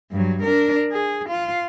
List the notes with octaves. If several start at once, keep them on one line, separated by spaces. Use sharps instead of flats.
G2 F#3
D4 A#4
G#4
F4